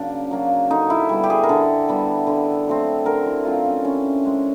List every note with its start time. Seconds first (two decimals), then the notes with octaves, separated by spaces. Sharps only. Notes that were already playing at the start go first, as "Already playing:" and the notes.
Already playing: C#3 F#3 A#3 D4
0.31 F#3 A#3
0.70 D3 D#4
0.90 E4
1.09 G3 B3
1.23 G4
1.30 G#4
1.43 A#4
1.49 D3 A4
1.89 G3 B3
2.27 D3
2.67 F#3 A3 C4
3.05 D3 A#4
3.26 E4
3.45 F#3 A3 C4 F4
3.65 C#4
3.85 E3 C#4
4.24 G#3 C4